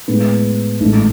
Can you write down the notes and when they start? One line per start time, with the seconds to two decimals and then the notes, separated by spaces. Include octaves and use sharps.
0.08 A2 G#3 B3
0.80 A1 G#2 E3 A3 D#4